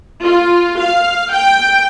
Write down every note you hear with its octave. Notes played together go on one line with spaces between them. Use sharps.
F4
F5
G5